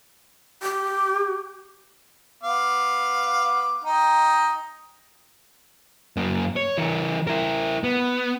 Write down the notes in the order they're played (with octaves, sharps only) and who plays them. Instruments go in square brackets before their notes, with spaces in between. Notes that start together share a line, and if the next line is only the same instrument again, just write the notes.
[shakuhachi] G4
[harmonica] B3 F5 D6
D#4 D#5 G5
[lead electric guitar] F#2 A#3
C#5
E3 A#4
E4 A#4
B3